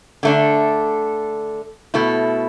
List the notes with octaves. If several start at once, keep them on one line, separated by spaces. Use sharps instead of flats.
D3 A3 D4
B2 A3 E4